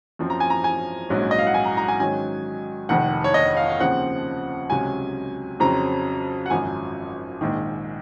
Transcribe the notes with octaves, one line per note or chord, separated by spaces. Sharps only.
F#2 F3 C4
A#5
G#5
A#5
G#5
A#1 G#2 F#3 C#4
D#5
F5
F#5
G#5
A#5
A#5
F#5
G#5
G#2 D#3 F#3 C#4 G#5
F1 F2 D#3 F#5
C#5
D#5
F5
F5
D#2 C#3 F3 C4 F#5
C#2 C3 F#3 C#4 G#5
F2 C#3 F#3 C4 A#5
F#5
G#1 F#2 F3 G#5
A#1 G#2 D#3